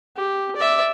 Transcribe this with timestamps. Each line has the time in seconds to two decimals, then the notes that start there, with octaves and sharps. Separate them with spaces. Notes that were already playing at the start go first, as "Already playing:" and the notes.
0.17 G4
0.56 D5 E5